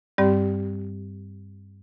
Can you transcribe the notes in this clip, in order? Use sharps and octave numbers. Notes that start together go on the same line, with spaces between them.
G2 G3 C4 G4 D5